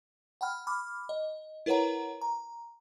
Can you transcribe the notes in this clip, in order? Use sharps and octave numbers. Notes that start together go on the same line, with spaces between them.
F#5 G5 B5 F6
B5 D6 F6
D#5
E4 A#4 B4 C#5 F#5 A#5
A#5